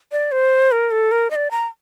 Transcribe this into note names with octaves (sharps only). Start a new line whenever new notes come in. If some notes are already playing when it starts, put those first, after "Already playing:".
D5
C5
A#4
A4
A#4
D#5
D5
A#5